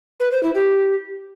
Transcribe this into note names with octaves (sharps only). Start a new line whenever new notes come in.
B4
C5
E4
G4